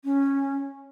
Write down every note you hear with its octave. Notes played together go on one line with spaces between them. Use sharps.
C#4